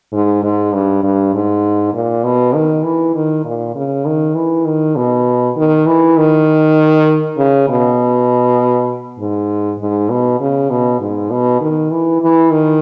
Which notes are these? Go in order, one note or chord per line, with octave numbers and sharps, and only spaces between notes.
G#2
G#2
G2
G2
G#2
A#2
B2
D#3
E3
D#3
A#2
C#3
D#3
E3
D#3
B2
D#3
E3
D#3
C#3
B2
G#2
G#2
B2
C#3
B2
G#2
B2
D#3
E3
E3
D#3